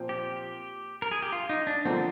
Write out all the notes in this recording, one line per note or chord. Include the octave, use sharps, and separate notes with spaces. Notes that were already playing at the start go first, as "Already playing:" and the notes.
Already playing: A#2 F3 C4
G4
A#4
G#4
G4
F4
D#4
D4
D3 F3 A#3 C4